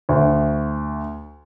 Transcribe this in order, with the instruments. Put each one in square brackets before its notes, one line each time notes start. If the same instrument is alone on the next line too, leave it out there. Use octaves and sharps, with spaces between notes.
[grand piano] D2